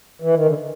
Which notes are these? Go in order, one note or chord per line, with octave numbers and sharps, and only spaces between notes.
E3
D#3
D3